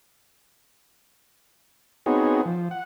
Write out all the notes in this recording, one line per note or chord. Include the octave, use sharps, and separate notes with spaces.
B3 C4 D#4 F#4 G#4 C#5
F3
F#5